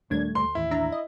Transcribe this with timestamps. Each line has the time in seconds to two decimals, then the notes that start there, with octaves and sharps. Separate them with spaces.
0.10 D#1 D#2 G3 A3 D4 G#6
0.35 D2 C6
0.55 A1 D#2 E4
0.71 D4 E5 A#5
0.92 D#5